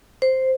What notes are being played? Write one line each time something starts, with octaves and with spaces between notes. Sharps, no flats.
C5